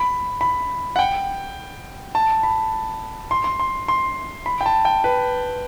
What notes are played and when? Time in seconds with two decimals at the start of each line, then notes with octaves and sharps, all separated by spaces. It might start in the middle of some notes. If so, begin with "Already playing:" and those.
Already playing: B5
0.41 B5
0.96 F#5
0.99 G5
2.15 A5
2.43 B5
3.31 C6
3.44 C6
3.59 C6
3.88 C6
4.46 B5
4.61 G5
4.66 A5
4.85 G5
5.04 B4